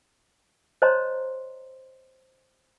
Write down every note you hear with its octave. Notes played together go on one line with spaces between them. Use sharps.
C5 C#5 D#5 A5 A#5 C6